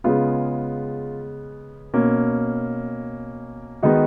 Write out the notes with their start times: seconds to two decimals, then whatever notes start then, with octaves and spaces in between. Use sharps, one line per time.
0.04 C#3 G#3 B3 F4
1.94 B2 A#3 C#4
3.82 D#3 G#3 B3 D#4 F#4